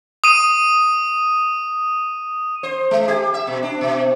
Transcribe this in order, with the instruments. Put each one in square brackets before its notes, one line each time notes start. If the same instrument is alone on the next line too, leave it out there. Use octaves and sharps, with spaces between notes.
[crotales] D#6 D#7
[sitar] C5
G#3
G4
E5
B2
D4
B2